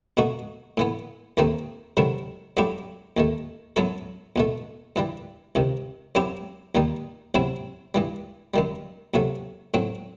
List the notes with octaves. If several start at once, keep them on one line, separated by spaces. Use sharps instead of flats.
B2 A3 D#4 F#4
A2 E3 B3
D#2 D#3 A3 C4 D#4
C3 D#3 F#3 A3 E4
G2 F#3 A3 E4 G4
D#2 D#3 A3
F#2 F#3 B3 E4 A4
E2 B2 A3
G2 E3 G3
C2 C3 D#3
F#2 F#3 C4 E4 G4
D#2 D#3 G3 D#4
E2 C3 F#3 C4 E4
G2 E3 G3
F#2 D#3 G3
E2 C3 F#3 A3
A2 F#3 C4